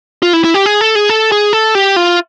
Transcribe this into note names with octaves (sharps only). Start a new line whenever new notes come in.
F4
E4
E4
G4
G#4
A4
G#4
A4
G#4
A4
G4
F4